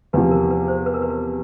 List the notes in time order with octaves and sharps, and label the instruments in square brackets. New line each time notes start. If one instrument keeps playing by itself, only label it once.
[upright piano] E2 C3 F3 [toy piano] B4
[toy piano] A#4
B4
C5
B4
A#4
B4
A#4